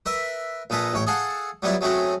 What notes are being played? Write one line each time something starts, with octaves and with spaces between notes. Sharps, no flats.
A#4 B4 E5
A#1 G#3 A4 B4 A#5
A1 C#5 G5
G#4 A4 F5 F#5 A5
F#3 G3 B3 E4 F4
F#3 G#3 A3 C4 C#4 F#4